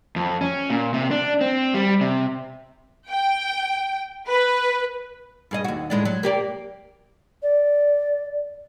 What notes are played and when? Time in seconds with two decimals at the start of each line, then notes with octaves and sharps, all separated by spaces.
0.16 F2
0.41 C#4
0.70 A#2
0.94 C3
1.11 D4
1.41 C4
1.74 G3
2.01 C3
3.10 G5
4.28 B4
5.51 G2 G#4 D#5
5.64 D#2 F#4
5.90 A2 G#3 D4
6.05 F#3
6.23 A#3 G4 D5
7.43 D5